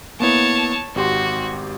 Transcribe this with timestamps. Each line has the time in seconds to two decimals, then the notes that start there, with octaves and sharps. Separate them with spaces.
0.20 A#3 B3 E4 C#5 A5
0.96 G#1 F#4 G4 C6